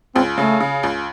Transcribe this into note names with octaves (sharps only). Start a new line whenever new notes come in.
C#2 C4
C#3 A3
C#3
C#2